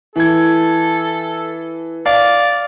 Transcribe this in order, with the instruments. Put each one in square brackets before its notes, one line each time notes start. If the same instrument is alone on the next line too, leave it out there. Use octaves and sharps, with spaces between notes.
[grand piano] E3 G#6 [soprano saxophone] A4
[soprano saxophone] D5 [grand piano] F5